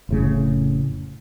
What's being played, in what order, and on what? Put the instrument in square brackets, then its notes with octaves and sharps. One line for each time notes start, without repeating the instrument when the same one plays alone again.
[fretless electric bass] F1 A2 C#3